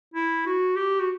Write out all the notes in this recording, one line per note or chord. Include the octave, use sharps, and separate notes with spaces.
E4
F#4
G4
F#4